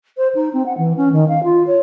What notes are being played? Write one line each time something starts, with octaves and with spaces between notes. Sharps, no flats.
C5
D#4
C4
F#5
E3
C#4
D#3
F5
F4
C#5